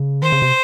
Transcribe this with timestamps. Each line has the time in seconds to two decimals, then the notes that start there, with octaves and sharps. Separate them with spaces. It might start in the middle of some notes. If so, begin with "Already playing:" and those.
Already playing: C#3
0.22 D#3 C5
0.32 C#3
0.42 C3